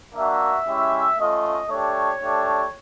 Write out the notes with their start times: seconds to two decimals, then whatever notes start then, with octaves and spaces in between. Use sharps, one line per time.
0.15 A#3 D4 F#4 E5
0.67 G#3 C#4 E4 G4
1.19 A3 C#4 F4 D#5
1.70 A3 D4 G4 C#5
2.22 A3 D4 G4